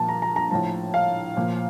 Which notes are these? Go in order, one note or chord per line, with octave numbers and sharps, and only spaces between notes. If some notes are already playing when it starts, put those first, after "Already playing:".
Already playing: A#2 F3 A5
A#5
A#5
A#5
A2 F3 A5
F5
A#2 F3